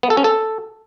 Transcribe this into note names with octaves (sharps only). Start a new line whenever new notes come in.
B3
A4
C#4
A4